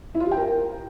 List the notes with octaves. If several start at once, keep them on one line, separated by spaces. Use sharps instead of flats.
E4
F4
G4
G5
A#4